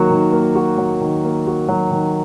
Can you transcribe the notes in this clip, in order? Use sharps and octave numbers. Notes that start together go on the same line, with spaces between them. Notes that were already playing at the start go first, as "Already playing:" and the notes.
Already playing: D#3 F#3 A#3 F#4
D#3
A#3
F#4
F#3
D#3
A#3
F#4
F#3
D#3